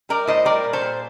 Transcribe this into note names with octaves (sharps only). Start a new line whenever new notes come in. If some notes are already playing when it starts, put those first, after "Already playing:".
G3 A#4 D5
A2 C5 D#5
G3 A#4 D5
A#2
A4 C5
A#2